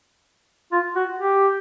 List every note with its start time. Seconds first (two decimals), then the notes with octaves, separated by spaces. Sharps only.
0.72 F4
0.96 F#4
1.19 G4